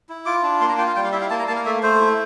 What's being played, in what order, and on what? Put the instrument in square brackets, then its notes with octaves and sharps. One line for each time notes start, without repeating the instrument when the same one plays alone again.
[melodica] E4
F4 D6
D4
A#3 C6
A#5
F4 G5
F5
G3 G5
F5
E4 E5
F5
A#3 A5
A#5
A#3 A5
F5
A3 E5
A3 C5
E4